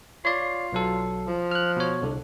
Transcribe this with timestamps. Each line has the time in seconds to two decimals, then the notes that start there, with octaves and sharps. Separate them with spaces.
0.25 F4 C#5 D5
0.72 B1 F#3 A4
1.28 F3
1.51 F6 F#6
1.77 B2 C#5
2.03 C2 D3